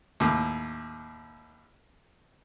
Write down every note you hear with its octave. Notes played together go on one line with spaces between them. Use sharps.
D#2 A2